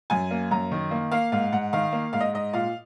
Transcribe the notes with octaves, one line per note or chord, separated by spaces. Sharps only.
F#2 G#5
A#3
F#2 A#5
D#3
A#3
A#3 F5
G#2 F5
G#2 F#5
D#3 F5
A#3
G#2 F5
D#5
G#2 D#5
A#2 F5